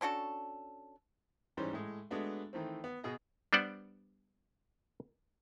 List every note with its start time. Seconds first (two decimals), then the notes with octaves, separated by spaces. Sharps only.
0.01 C#4 D4 F#4 A4
1.57 G#2 E3 G3 C#4 C5
1.73 A2 G#3
2.11 G#3 A3 B3 D4 F#4
2.53 D#3 E3 A3 C4
2.84 B3
3.04 B2 G#4 D#5
3.53 G3 B3 D4 C5 D5 F#5